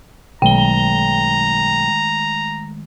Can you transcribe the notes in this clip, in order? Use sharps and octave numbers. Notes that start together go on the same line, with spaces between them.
B1 D#3 G#3 A3 G5 A#5 G7